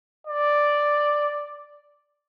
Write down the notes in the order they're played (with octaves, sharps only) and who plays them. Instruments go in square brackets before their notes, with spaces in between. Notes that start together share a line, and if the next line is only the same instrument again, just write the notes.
[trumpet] D5